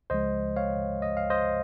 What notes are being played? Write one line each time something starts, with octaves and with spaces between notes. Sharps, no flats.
C#2 C#3 F3 G#3 C5 D#5
C#5 F5
D#5
F5
C5 D#5